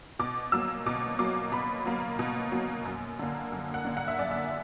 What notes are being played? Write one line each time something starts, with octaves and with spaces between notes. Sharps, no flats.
B2 D6
F#3 A#3 E6
B2 D6
F#3 A#3 D6
B2 B5
F#3 A#3
B2
F#3 A#3
F#2
D3 A#3
F#2
F#5
D3 A#3
F#5
E5
F#2 D5
E5